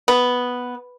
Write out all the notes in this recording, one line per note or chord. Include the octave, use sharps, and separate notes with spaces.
B3